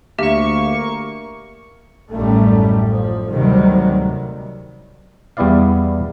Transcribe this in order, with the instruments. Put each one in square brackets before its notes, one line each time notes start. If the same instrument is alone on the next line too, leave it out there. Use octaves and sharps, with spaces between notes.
[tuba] D2 [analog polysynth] A#3 C#6 [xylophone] G4 E5
[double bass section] A1 F#2 D#3 G3 A3
F3
D2 C3 D#3 F#3 G3
[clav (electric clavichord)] E2 G3 B3 E4 D5 F5